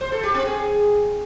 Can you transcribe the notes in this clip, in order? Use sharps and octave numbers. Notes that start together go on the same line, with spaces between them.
C5
A4
G4
C4
G#4